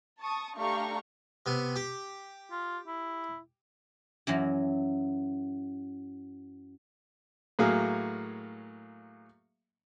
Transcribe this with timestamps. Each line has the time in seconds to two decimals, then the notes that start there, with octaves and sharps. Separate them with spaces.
0.20 A5 C#6 D#6
0.56 A3 D4 G4 F5 A#5 C#6
1.46 C3 B3
1.76 G4
2.51 F4
2.87 E4
4.27 F#2 E3 F#3
7.59 A2 F#3 A#3 G#4 F5